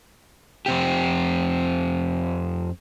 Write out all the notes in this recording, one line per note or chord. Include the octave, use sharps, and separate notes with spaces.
F2 C4 G4